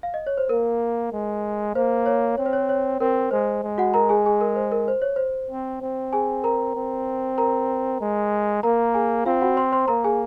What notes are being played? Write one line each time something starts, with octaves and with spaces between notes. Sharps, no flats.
F5
D#5
C#5
C5
A#3 A#4
G#3
A#3 C5
C#5
C4 C#5
C5
C#5
C#5
C4 A#4
G#3 C5
G#3
F#4 F#5
A#4 A#5
G#4 G#5
G#4 G#5
A#4
C5
A#4
C5
C#5
C5
C4
C4
G#4 G#5
A#4 A#5
C4
A#4 A#5
G#3
A#3 A#4 A#5
G#4 G#5
C4 F4 F5
F#4 F#5
C5 C6
C5 C6
A#3 A#4 A#5
G#4 G#5